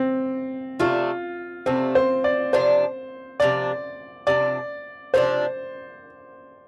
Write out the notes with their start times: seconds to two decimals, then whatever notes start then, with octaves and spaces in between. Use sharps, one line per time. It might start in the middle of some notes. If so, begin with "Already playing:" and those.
Already playing: C4
0.80 C3 A3 D4 F4
1.66 C3 A3 C4 D4
1.95 C5
2.24 D5
2.53 C3 F3 D4 C5
3.40 C3 F3 D4 D5
4.27 C3 F3 D4 D5
5.14 C3 F3 D4 C5